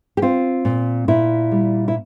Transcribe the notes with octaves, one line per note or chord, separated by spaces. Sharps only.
G4
C4 F4
A#2
A#2 E4
G3
E4